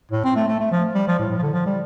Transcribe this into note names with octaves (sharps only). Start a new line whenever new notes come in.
A2
C4
A3
A3
A3
F3
G3
F3
A2
A2
F3
D3
F3
G3